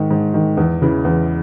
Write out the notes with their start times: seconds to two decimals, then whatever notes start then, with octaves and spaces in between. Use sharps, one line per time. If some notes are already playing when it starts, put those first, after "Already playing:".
Already playing: G#2 D#3
0.11 G#2
0.34 D#3
0.57 E2
0.82 C#3 E3
1.05 E2